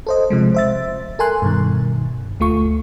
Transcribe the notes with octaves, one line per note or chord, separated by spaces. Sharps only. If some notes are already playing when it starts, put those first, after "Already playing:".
A4 C5 D#5
C3 F3 G#3
C5 E5 A6
A4 A#4 G#5 C6 F#6
G2 B2 D#3
D2 A3 F4 C#6